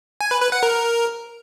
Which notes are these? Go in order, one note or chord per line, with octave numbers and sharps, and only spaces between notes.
G#5
B4
B4
F#5
A#4